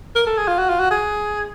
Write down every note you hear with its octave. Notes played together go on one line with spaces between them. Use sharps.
A#4
A4
G#4
F4
F#4
F4
F#4
G#4